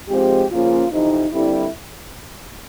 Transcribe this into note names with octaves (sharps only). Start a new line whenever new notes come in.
G#2 F3 G#3 C4 G4
C#3 F3 A#3 C#4 F4
F2 C3 E3 D#4
G2 D3 G3 C4 E4